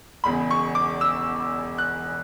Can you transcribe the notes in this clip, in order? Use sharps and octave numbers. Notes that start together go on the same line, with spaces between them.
E1 E2 C#3 B5
C#6
D6
E6
F#6